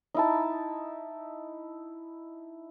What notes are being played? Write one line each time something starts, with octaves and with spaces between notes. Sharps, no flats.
D#4 E4 A5